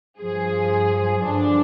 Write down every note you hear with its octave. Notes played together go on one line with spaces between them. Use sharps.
G2 F3 G#4
G2 D3 F3 D4